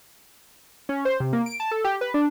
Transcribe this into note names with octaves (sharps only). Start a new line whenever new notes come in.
C#4
C5
C3
A#3
D7
A5
A4
G4
B4
D4